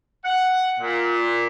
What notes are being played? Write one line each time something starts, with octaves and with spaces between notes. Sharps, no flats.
F#5
A#2